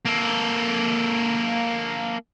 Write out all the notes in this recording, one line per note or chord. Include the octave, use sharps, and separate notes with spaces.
A#3 A4